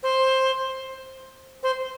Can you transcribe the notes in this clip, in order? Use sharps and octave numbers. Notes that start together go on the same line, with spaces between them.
C5
C5